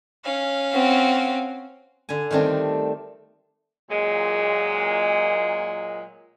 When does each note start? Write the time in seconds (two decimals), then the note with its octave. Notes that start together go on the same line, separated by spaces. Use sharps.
0.24 C#4 F5
0.73 C4 F#4
2.09 D3 G#5
2.31 D#3 G3 A3 C4 D4
3.89 A#2 F#3 G#3